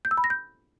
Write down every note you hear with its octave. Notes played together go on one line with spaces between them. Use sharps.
G6
E6
B5
A#6
G6